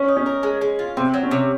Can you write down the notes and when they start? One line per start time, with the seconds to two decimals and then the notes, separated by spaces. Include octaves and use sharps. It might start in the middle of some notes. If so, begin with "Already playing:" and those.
Already playing: C#4
0.08 D#4
0.17 C#4
0.26 A#4
0.43 G#3
0.61 G#3
0.79 F4
0.97 C3 C4
1.14 F#3
1.23 C#4
1.31 C3